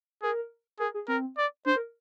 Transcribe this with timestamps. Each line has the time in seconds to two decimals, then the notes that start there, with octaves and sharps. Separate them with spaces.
0.22 G#4 A#4
0.79 G#4 A#4
0.94 G#4
1.08 C4 A#4
1.38 D5
1.66 D4 C5
1.76 A#4